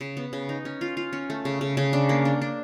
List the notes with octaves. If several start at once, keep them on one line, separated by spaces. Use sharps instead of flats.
C#3
B3
C#3
D#4
C#4
F4
F4
C#4
A3
C#3
C#3
C#3
D4
A#3
D4
D4